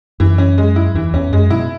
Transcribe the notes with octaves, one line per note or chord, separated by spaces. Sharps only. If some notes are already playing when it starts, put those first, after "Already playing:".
F#2 E3
C#4
G#3
E4
E2 E3
E2 C#4
F#2 G#3
B2 E4